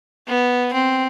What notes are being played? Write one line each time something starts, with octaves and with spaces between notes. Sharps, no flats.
B3
C4